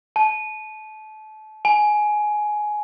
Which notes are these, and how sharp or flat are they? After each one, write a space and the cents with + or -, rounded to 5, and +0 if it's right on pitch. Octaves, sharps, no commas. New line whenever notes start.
A5 -30
G#5 +15